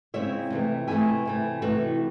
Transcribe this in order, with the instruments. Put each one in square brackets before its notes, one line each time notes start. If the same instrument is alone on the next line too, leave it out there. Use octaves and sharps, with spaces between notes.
[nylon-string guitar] C#3 G#3 C4 E4 C#5 E5
C3 E3 A3
C3 E3 A3 E5 G#5
C3 E3 A3
C3 E3 A3 F#4 A4